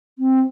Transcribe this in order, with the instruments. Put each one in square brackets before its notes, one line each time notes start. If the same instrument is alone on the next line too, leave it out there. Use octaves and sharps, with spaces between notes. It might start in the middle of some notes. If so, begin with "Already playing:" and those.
[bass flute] C4